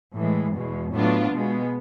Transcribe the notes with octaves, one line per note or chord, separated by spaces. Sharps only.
A2 E3 G#3
E2 B2 G#3
A2 F#3 B3 D4 F4
B2 G#3 B3